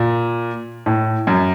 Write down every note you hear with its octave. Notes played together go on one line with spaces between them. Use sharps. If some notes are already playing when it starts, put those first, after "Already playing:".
Already playing: A#2
A2
F#2